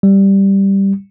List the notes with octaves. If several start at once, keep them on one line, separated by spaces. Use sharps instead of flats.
G3